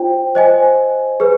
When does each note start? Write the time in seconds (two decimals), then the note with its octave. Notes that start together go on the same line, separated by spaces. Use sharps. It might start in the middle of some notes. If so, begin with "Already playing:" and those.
Already playing: F4 C5 G5
0.35 C5 D#5 G#5
1.20 G#4 B4